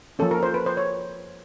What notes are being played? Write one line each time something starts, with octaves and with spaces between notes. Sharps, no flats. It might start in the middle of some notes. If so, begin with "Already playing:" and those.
F3 A#3 C#4 A4
A#4
C5
B4
C5
C#5